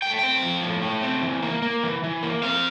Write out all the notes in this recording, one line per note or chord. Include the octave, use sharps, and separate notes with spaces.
A3 G5
C4 G5
F3
A2
A3
C4
E3
A#3
A#3
E3
E3
A#3
C4 F5